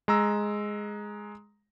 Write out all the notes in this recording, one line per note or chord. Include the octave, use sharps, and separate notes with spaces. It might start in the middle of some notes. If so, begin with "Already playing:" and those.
G#3 A#5 E6